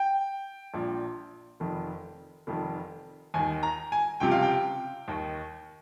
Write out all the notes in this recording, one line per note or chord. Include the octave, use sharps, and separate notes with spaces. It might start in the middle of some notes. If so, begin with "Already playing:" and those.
Already playing: G5
A#1 A#2 F3
F1 F2 D#3
F1 F2 D#3
D#2 D#3 G#5
A#5
G#5
C#2 C3 F3 G5
F5
G5
D#2 D#3